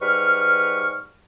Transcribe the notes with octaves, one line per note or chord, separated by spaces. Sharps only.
G#2 G3 B4 C#6 F6